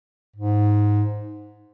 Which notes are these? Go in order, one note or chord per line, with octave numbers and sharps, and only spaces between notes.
G#2